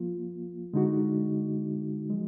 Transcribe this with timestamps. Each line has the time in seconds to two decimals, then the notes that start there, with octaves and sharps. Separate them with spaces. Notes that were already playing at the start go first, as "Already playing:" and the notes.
Already playing: F3 A#3 F4
0.73 D3 G#3 D#4 F#4
2.10 F3 G#3